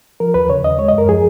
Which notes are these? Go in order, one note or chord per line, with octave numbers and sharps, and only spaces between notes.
F3 A#4
D#2 B4
C#3 C#5
D#2 D#5
G#3 C#5
D#5
F#2 A#4
F3 G#4